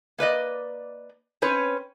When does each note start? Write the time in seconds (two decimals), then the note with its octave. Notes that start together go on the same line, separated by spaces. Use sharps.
0.18 A#3 B4 D5 D#5
1.42 C4 C#4 B4 C#5